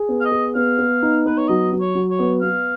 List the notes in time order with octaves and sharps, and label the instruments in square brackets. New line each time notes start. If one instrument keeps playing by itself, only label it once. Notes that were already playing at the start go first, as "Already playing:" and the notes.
Already playing: [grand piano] G#4
B3
[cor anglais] F5
D#5
[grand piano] G#4
[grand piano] B3 [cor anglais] F5
[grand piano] B3
D#4
[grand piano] B3 [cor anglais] B4
[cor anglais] C#5
[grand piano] F#3 [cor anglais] D#5
[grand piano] F#3
[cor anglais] C#5
[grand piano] F#3
[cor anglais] C#5
[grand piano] B3
[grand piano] B3 [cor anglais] F5